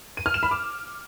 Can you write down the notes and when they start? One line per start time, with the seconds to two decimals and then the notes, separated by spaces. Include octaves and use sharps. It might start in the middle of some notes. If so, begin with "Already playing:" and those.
0.17 D#7
0.26 F6
0.34 E7
0.43 B5
0.51 D6